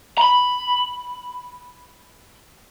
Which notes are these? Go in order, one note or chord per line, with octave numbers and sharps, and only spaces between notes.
A#5 B5